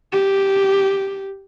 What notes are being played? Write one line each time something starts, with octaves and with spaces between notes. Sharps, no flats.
G4